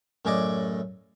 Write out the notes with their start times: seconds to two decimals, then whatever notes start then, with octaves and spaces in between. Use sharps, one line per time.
0.25 F#2 A2 G#4 D5 D#5 D6